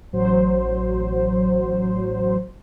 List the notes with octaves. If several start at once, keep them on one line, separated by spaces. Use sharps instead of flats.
A1 F#3 C5